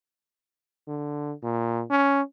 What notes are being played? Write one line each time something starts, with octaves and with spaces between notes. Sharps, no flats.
D3
A#2
C#4